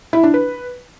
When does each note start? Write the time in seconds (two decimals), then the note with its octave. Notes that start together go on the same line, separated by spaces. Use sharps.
0.13 E4
0.23 D4
0.34 B4